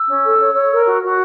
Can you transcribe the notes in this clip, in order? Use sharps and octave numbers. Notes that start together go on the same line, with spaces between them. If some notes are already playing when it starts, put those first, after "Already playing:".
Already playing: E6
C#4
A4
C#5
C#5
A#4
F#4
F#4